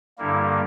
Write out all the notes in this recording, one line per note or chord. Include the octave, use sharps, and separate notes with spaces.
G2 D3 G3 A#3 E4